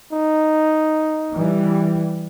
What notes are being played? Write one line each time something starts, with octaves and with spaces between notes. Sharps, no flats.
D#4
E3 G3